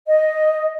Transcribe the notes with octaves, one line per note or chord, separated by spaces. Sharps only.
D#5